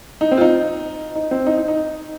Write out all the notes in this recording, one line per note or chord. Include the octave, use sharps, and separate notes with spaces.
D#4
C4
F4
D#4
D#4
C4
D#4
D#4
D#4